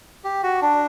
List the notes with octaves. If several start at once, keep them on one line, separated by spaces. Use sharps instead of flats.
G4
F#4
D4